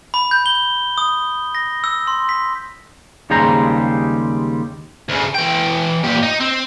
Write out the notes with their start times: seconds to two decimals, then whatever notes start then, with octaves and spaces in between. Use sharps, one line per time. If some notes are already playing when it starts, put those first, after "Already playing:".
0.14 B5
0.31 G6
0.46 G7
0.98 D#6
1.55 A#6
1.84 E6
2.07 C6
2.29 B6
3.30 D#2 C#3 G3 G#3 C5 A#5
5.09 D2 C#3
5.35 E3 G5
6.04 A#2 G4
6.23 D#4
6.41 C4